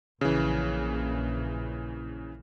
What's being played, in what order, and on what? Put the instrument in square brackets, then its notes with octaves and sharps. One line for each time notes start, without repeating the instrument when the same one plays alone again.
[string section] A#1 [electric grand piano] C#3 E3